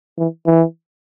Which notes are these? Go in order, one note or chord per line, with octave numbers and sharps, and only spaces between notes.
E3
E3